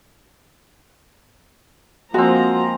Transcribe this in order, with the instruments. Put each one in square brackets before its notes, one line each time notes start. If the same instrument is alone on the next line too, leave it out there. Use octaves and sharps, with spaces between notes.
[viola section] F3 A#3 A#5 [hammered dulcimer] G#3 C4 [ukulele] F#4